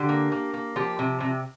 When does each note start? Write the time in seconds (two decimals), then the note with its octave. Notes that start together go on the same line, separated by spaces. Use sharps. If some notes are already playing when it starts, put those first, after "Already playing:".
Already playing: D3 G4
0.09 A#3
0.32 A#3
0.54 A#3
0.76 F3 G4
0.99 C3
1.20 C3